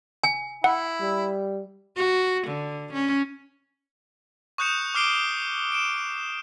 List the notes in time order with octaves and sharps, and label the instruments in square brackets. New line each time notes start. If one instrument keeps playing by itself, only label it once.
[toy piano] G#5
[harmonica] E4 [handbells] F#5
[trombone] G3
[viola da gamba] F#4
D3
C#4
[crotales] C#6 D#6 F#6 G6 C#7 E7
D6 F6 C7 D7 G7
D7 E7